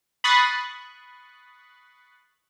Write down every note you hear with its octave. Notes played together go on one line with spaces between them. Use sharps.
B5 C#6 D#6 F#6 A6 C7